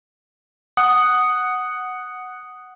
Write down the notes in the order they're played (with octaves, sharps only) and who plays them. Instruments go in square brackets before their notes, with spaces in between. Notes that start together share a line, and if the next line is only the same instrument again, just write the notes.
[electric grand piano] F#5 [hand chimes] D#6